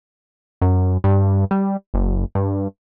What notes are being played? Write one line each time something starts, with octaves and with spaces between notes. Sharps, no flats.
F#2
G2
G3
F#1
G2